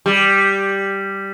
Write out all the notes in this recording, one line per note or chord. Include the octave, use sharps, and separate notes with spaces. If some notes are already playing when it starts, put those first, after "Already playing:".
G3